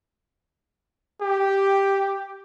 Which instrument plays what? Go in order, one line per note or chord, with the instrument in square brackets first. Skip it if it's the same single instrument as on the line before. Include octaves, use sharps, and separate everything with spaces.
[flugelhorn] G4